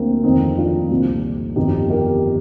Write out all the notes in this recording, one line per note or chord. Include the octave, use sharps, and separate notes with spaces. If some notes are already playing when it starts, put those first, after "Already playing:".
Already playing: D2 D3 A#3 C4
F1 F2 D#3 C4 D#4
D4 F4
C2 A#2
G1 F2 D#3 D#4 G4
G4 A#4